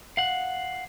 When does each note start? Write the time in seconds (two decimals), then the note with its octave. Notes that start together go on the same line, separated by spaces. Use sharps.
0.17 F5 F#5